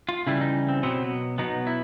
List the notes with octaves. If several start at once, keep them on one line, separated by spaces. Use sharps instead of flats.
F4
C#3 E3 G3 E4
D#4
C4
B2 F#3 B3 C4
B2 F#3 B3 D#4
E4